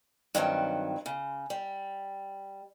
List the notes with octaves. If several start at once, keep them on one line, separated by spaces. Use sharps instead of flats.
G2 D#3 F#3 C4
C#3
G3